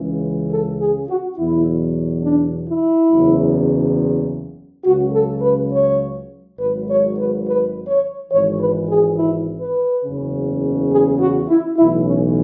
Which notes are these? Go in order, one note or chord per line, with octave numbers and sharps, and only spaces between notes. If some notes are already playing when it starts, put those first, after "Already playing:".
Already playing: C#2 C#3 E3
A4
G#4
F#4
E2 B2 F#3 E4
D4
E4
F#1 E2 C#3 F#3
C#2 C#3 F#3 F#4
A4
B4
C#5
G#1 G#2 F#3 B4
C#5
B4
B4
C#5
G#1 G#2 E3 C#5
B4
G#4
E4
B4
F#1 E2 C#3
G#4
F#4
E4
B1 A2 E3 E4
C#4